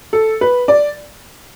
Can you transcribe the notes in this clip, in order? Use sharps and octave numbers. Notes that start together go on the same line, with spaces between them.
A4
B4
D5